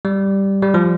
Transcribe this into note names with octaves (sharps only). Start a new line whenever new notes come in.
G3
G3
F3